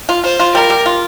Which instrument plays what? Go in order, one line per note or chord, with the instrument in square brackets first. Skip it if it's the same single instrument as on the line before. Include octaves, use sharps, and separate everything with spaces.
[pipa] F4
[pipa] F4 [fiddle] C5
[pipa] F4
[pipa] G3 [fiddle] A#4
[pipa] G3
F4